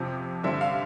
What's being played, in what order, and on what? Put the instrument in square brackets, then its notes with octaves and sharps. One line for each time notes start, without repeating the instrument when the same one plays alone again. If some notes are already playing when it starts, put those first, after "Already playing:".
Already playing: [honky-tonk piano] F2 C3 F3
G2 D3 G3 C4 E5
F5